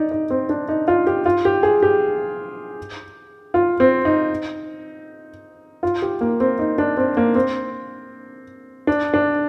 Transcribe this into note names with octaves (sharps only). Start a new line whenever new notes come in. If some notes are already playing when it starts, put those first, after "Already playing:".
Already playing: D#4 D5
D#4
C4
D4
D#4
F4
G4
F4
G4
G#4
G4
F4
C4
D#4
F4
G4
A#3
C4
D#4
D4
C4
A#3
C4
D4
D4